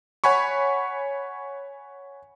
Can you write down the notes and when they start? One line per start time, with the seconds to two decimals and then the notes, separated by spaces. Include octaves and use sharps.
0.24 C#5 F#5 G#5 B5 C#6